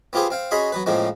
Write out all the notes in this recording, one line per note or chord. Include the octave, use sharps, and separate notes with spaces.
B3 C4 F4 G4 G#4 C5
C4 F5 G5
C#4 F#4 G#4 D#5 B5 C6
F#3 B3 B4
A2 C#3 F3 G#3 A#3 C4